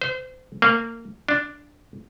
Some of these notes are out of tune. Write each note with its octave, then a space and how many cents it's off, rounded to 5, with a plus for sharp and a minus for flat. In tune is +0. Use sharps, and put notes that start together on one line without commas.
C5 -30
A#3 -25
D4 +0